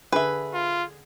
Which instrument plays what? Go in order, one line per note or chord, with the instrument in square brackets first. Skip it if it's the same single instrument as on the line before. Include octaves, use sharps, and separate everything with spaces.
[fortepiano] D3 G#4 [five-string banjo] B4 E5
[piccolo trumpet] F4